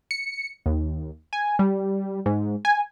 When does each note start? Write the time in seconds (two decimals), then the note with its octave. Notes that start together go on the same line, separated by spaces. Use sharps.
0.11 C#7
0.66 D#2
1.33 G#5
1.59 G3
2.26 G#2
2.65 G#5